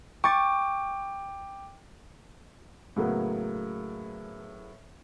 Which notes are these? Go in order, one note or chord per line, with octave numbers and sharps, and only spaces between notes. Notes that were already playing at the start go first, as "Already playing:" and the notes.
G5 C#6 D6 A6
A2 C#3 F#3 A#3 B3